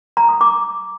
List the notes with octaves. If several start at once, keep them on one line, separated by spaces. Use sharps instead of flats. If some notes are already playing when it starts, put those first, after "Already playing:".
A#5
D#6
D6